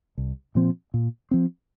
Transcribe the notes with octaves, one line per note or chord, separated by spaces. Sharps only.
C2
A#2 F3 C4
A#2
F3 C4